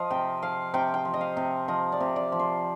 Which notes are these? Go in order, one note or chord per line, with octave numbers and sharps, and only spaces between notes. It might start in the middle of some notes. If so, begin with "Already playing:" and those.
Already playing: F3 D#5 F5
C3 G5
F3 F5
C3 G5
G5
F3
D#5
F5
C3
F3 D#5
D5
C3
D5
F3
C5